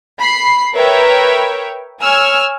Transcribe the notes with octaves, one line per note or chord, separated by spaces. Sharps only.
B5 C7
A#4 B4 C#5 E5 G5
C#5 G#5 E6 F6